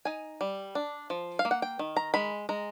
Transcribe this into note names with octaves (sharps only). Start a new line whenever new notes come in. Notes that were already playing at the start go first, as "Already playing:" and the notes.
D#4 G#5
G3
D4
F3
F5
A#3
F#5
G5
D#3
A#5
G#3 B5
G#3 A#5